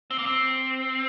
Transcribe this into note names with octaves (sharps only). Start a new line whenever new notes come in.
C4
A#3
C4